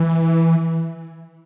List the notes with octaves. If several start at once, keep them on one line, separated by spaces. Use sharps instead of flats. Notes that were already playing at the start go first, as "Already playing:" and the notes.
Already playing: E3